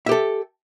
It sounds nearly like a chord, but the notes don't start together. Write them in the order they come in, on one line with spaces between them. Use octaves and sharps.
E5 G4 A4